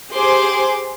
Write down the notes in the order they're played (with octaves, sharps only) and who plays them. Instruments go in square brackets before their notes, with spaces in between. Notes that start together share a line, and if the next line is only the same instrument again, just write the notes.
[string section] G4 G#4 C5 C6 D6